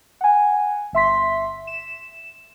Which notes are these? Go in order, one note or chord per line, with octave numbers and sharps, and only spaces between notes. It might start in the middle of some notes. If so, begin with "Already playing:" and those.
F#5 G#5
G1 E5 C6 B6
E7